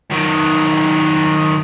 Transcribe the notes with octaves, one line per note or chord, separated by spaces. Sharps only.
D#3 F#3